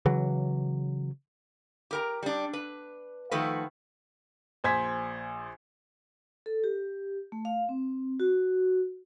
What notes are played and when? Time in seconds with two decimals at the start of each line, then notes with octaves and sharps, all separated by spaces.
0.06 C#3 E3 F#3
1.91 G4 A#4 A#5
2.23 G3 D4
2.53 B4
3.31 D#3 F3 A3 F#4 B4
4.64 A#1 C5 G#5 G#6 B6
6.46 A4
6.64 G4
7.32 A3
7.45 F5
7.69 C4
8.20 F#4